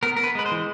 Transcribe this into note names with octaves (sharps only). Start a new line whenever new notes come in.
B3 A#4
B3 A#4
B4
G#3 B4
C5
E3